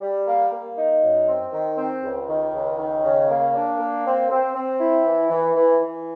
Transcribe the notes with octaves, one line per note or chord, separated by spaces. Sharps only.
G3
A#3
A#3
D#4
F#2
C4
D#3
C4
C#2
D#3
C#2
D#3
C#3
A#3
D4
A#3
C4
C4
C4
E4
E3
E3
E3
E3